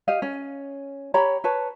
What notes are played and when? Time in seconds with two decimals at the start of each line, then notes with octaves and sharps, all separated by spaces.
0.08 G4 D#5 F5
0.22 C#4
1.14 G4 C#5 A#5 B5
1.44 B4 C#5 A5